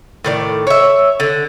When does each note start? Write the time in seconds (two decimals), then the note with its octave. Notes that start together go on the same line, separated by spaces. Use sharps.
0.25 A2 D#3 D5
0.67 C#5 E5
1.20 D3